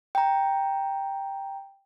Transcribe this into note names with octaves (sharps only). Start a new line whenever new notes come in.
G5 A#5